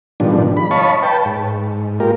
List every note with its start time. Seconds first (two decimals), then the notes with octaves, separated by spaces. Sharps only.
0.20 G#2 B2 D#3 F3 G3 D4
0.57 B5
0.71 C#5 D#5 F5 A5 B5 C#6
1.03 B4 G5 A5
1.25 G#2
2.00 G#3 A#3 F4 G4 A#4